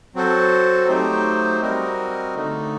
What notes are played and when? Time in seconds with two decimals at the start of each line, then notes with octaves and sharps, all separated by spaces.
0.15 F#3 C4 F#4 A4 C5
0.88 F#3 A3 D#4 G4 C5
1.61 G3 C4 F#4 A#4 D#5
2.35 D3 A3 D#4